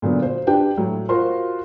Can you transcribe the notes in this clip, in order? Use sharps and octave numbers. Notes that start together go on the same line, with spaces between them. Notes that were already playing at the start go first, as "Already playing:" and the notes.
A#2 D3 F#3 B3
C5
D4 G4 B4 G5
A2 F#3
F4 F#4 A#4 C5 C6